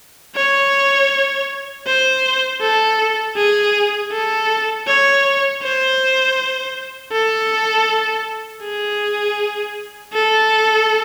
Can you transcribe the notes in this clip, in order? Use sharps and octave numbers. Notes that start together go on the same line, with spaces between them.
C#5
C5
A4
G#4
A4
C#5
C5
A4
G#4
A4